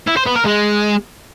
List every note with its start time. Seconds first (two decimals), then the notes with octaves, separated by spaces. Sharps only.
0.07 E4
0.17 C5
0.26 B3
0.36 A#4
0.45 G#3